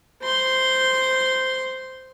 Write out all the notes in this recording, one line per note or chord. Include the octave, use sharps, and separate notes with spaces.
C5 C6